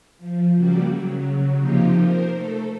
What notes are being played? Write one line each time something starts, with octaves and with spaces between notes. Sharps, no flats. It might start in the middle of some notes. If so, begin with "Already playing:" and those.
F3
C#3 F#3 G3 A#3 F#4 G4
C#3 F#3
C3 F3 A#3 D#4 F4 G4
A#4 C5
A3 A4